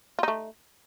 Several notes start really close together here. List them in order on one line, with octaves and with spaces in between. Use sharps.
F4 D#4 A3